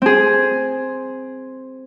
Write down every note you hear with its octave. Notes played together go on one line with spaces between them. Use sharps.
C4 G#4